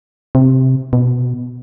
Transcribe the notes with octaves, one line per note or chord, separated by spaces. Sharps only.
C3
B2